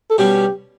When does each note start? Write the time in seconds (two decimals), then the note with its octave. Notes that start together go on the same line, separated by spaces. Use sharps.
0.10 A4
0.18 B2 G3 C#4 G4